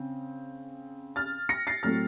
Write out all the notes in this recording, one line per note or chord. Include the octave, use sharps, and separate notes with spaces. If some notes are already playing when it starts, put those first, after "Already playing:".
Already playing: C#3 C4
F6 A6
A#6 C#7
A6 C7
A2 F#3 A3 C4 F6 A6